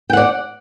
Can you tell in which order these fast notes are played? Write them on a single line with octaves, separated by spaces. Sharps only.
G5 F#5 D5